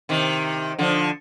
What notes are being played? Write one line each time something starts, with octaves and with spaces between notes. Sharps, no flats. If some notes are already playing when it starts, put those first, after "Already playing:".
C3 D#3
D3 F3